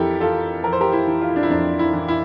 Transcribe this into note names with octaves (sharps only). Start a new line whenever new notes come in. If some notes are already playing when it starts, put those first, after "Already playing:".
Already playing: F2 E3 E4 G4 A4 A#4
E3 F4 A4
F2 A#4
C5
G4 A#4
E4
E3
F4
E4
D4
E4
F2 D4
E4
E3
E4